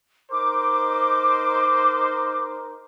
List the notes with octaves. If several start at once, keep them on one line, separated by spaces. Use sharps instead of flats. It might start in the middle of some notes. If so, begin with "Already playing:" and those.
D#4 A#4 C5 D6